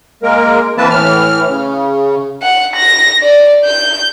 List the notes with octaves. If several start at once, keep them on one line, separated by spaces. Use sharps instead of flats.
G#3 A#3 A#4
E3 A#3 C4 B4 A5
A2 E3 F6
C#3
F#5
A#6
D5
G6